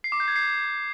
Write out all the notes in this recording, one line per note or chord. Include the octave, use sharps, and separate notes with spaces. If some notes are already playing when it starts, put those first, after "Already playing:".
C7
D6
G6
G#6
C7